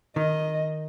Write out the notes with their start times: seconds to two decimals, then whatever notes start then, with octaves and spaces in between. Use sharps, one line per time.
0.16 D#3 D#5